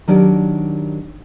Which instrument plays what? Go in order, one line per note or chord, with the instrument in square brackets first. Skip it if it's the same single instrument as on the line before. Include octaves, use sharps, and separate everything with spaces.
[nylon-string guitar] D#3 F#3 D4 G4 A#4 D5